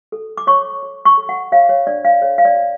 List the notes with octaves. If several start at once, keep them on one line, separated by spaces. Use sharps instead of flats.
A4
D6
C#5 C#6
C#5
C#6
A4
F#5
C#5 F5
C#5
D4 D5
F5
A4 C#5
F5
D5
C#5